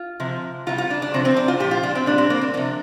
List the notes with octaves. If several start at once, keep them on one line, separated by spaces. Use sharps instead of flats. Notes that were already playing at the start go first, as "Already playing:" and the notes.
Already playing: F4
C3 F3
C3 G3 F4
F4
D4
D4
C3 F3 C4
C4
D4
F4
A#2 F3 G4
F4
D4
C4
A#2 G3 D4
C4
A#3
C4
C3 F3 D4